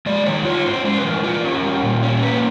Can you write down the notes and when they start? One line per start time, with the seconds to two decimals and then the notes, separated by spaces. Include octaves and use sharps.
0.06 G#3 D5
0.26 D#3 C#5
0.45 F4 C#5
0.65 C#4 C5
0.84 G#3 C5
0.98 B4
1.04 E3 A#4
1.23 F4 A#4
1.44 C#4
1.63 G3
1.83 A#2
2.03 C#4
2.22 A#3 B4